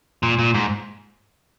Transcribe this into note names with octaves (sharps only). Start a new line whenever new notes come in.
A#2
A#2
G#2